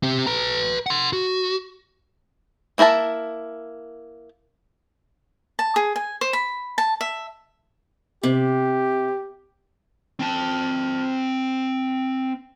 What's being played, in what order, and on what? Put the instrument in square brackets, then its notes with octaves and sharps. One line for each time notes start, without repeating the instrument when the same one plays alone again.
[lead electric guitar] C4 G4
B4 A#5
F#5 C6
F#4
[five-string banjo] A#3 E4 A#4 E5 A5
[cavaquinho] A5
G#4
G#5
C5
B5
A5
E5
[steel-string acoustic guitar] C3 [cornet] G4
[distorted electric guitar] C4 A5